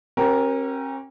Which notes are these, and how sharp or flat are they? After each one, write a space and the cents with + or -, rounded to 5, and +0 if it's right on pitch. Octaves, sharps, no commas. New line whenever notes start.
C#4 -45 G4 -35 A#4 +10